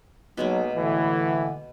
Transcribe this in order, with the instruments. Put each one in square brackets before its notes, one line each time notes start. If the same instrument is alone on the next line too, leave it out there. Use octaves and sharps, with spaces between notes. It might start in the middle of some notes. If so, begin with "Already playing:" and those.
[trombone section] B1 [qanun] B2 G#3 A#3 [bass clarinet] F#3
[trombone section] A2 E3 [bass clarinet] D3